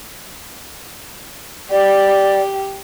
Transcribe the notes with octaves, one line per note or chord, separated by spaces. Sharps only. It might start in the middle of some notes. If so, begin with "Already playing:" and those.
G4 D5